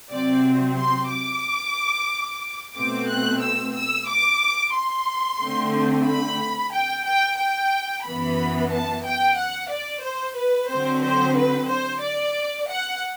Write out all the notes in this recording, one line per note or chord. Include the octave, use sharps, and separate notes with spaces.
C3 F#3 C4 D5
C6
D6
B2 A3 C4 D6
F#6
E6
E6
D6
C6
D3 A3 C4
B5
G5
G5
G5
F#2 E3 B3 B5
A5
G5
F#5
D5
C5
B4
D3 F#3 C4 C5
C5
B4
C5
D5
F#5